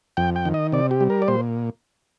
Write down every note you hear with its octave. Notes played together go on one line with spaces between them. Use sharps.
F2 G5
G5
D#3
D#5
C3 D5
G4
G3
A#4
D5
A#2 C5